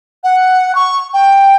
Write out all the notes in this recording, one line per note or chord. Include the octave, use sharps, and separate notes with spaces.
F#5
C#6
G5